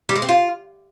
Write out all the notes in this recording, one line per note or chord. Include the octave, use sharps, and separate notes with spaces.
G3
G#3
C4
F4